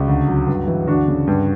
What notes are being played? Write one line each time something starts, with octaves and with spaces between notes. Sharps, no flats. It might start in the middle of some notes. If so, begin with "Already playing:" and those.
Already playing: C#2 F#4
D2
F#3
G2
E3
D2 D4 F#4
C#3
G2